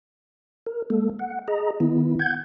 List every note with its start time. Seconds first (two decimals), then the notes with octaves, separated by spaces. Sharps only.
0.67 A#4
0.90 G#3 A#3 A4
1.19 F#5
1.48 G#4 D#5 A#5
1.80 D#3 B3 E4
2.19 F#5 G6 G#6